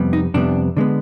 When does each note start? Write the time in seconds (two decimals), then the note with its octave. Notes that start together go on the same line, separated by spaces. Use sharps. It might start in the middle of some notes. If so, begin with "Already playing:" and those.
Already playing: F2 C3 G3 B3
0.13 D#4
0.34 F2 C3 G3 B3 D4
0.77 D3 G#3 B3